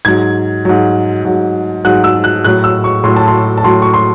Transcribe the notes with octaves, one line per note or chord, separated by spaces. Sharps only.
G#2 F#3 G#6
G#2 F#3
G#2 F#3
G#2 F#3 F#6
E6
F#6
A2 F#3 F#6
E6
C#6
A2 F#3 C6
A5
C6
A5
A2 F#3 C6
C#6
C6